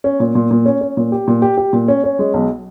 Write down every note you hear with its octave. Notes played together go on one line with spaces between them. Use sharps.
C#4
A#2
A#2
A#2
C#4
C#4
A#2
G4
A#2
G4
G4
A#2
C#4
C#4
G#3
B1